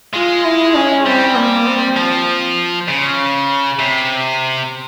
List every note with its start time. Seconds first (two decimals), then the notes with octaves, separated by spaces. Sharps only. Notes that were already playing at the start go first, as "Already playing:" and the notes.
0.14 G#3 F4
0.45 E4
0.75 C#4
1.06 G3 C4
1.36 A#3
1.67 C4
1.96 F3
2.88 C#3
3.79 C3